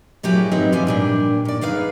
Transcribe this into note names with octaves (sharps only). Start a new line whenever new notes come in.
A#2 F#3 E4 G4 G#4
F#3 C4 D#4 B4 E5
E2 F3 G4 G#5
A#2 G3 D4
D#3 D5
D#4 G#4 B4 F5